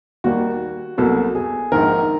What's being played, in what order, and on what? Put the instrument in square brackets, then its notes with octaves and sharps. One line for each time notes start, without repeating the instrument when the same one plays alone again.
[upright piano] D#2 D#3 G3 A#3 [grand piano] F#4
[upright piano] C2 B2 F#3 A#3 [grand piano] A4
[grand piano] G#4
[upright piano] A#1 G#2 D#3 [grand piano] A#4